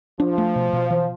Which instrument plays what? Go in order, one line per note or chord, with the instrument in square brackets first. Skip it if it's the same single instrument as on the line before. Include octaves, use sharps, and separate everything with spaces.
[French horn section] F3 [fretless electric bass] D4
[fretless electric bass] A3
B2
B2
E3